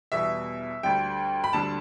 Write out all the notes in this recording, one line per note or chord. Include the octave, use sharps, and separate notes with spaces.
E2 B2 G3 E5
D2 D3 G3 G5
B5
D2 D3 G3 A5